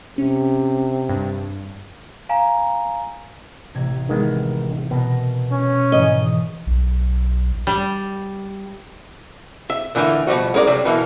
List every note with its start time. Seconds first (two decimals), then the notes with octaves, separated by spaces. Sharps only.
0.18 C3 C#4
1.09 G2
2.29 F5 G#5 A#5
3.75 A1 C3 G#6
4.09 D#3 G#3 B3
4.91 B2 B3 A#4 D#5
5.52 C#4
5.92 G#2 D#3 E3 D#5
6.67 B1
7.67 G3
9.70 E5
9.95 A#2 D3 E3 F#3 A3 A#3
10.27 B2 F3 G3 F#4
10.54 G#3 C#4 A#4 C5 D5
10.67 G2 C3 F#3 G3
10.85 B2 E3 A#3 D#4